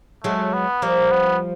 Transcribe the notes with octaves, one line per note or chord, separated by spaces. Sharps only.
F#3 G#3 A3
B3
F3 G3 A#3
B3